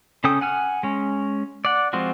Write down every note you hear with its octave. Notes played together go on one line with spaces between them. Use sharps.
C#3 C#4 A4 G5 D#6
F#5 G#5 F6
G#3 C#4
D5 F#5
F3 G#3 C4 F4 F#4